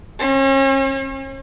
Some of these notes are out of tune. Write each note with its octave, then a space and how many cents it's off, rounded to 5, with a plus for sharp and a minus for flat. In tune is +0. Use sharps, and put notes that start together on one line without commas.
C#4 -40